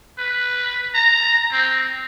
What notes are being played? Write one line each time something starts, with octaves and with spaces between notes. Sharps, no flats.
B4
A#5
C4